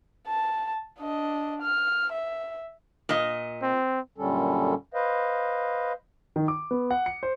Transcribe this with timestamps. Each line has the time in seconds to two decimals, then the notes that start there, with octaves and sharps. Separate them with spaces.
0.28 A5
0.99 D4 D#5
1.62 F6
2.13 E5
3.09 A#2 D#5
3.62 C4
4.18 F#2 A#2 D3 G3 C#4 A4
4.94 B4 C5 D#5 F5
6.36 D#3
6.48 D6
6.71 B3
6.91 F#5
7.06 C#7
7.23 C5